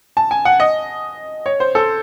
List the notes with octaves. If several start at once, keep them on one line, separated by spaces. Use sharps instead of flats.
A5
G#5
F#5
D#5
C#5
C5
A4